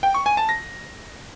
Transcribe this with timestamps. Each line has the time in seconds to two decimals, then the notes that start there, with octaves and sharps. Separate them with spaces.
0.03 G5
0.14 C#6
0.26 G#5
0.37 A5
0.49 A#6